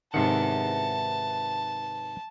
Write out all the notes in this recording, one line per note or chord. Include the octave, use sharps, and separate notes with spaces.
G#2 C3 D#3 B4 E5 F#5 A5